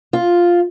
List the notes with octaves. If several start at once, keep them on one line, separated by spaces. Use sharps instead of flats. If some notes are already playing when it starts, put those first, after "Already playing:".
F4